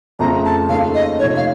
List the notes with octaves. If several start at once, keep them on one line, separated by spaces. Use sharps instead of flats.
F2 C#3 F3 A3 A#5
A5
D#2 C#3 A3 C#4 A4 F5
D#5
C3 F3 A3 D#4 C#5
F5